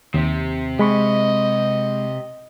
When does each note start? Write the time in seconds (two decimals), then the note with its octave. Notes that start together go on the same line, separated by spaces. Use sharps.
0.14 D#2 C3
0.79 G#3 D#5 B5 C#6